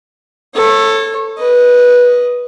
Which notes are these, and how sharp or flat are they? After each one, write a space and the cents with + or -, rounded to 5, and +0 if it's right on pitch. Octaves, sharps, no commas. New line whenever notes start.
A4 +15 C#5 -25
B4 -15 D#5 +0